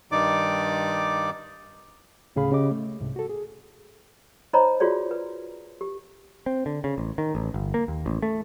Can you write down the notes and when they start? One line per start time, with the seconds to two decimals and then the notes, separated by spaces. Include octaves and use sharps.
0.12 G2 D#3 D#4 D5 D6
2.36 D2 A2 C#3 G#4 F5 B5
2.52 C#3 G4 D#5 D6
2.71 A3
3.00 C2 G#2 C3
3.16 F#4 A4
3.29 G#4
4.53 D#4 C5 C#5 D#5 A#5 B5
4.80 F4 F#4 G#4 C#5 D5
5.11 B4
5.81 G4
6.46 C4
6.66 D3
6.84 C#3
6.98 A1
7.18 D#3
7.35 A1
7.54 G1
7.74 A#3
7.88 D#2
8.06 A1
8.22 A3